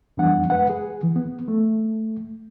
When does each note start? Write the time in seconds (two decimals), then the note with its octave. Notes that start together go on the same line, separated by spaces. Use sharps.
0.17 F2 E3 G3 B3 D4 F#5
0.50 G#3 B4 F#5
0.70 G#4
1.03 E3
1.16 B3
1.48 A3